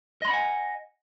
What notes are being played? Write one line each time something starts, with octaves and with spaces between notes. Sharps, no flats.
D#5 F#5 G#5 B5 C6